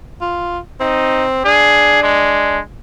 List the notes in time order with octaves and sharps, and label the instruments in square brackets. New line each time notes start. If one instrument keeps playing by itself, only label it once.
[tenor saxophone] F4
[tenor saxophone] C4 [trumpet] D#4
[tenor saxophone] D4 [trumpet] G#4
[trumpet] G#3